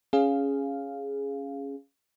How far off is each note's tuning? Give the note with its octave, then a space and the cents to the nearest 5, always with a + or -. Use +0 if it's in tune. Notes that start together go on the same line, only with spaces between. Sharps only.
C#4 +0 G#4 +0 F5 +0